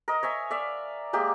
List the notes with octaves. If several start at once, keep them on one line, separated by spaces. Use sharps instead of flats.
A#4 D#5
C#5 E5 G#5
D5 E5 F5
G#3 A#3 G4 A#4